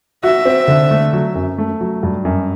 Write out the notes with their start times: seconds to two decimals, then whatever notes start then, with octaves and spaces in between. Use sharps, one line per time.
0.23 F#4 E5
0.45 C4
0.68 D3
0.91 A3
1.13 F#3
1.35 F#2
1.58 A3
1.81 F#3
2.03 G2
2.25 F#2